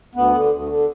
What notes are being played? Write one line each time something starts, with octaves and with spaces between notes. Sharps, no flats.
D2 B3
D3
D2
D3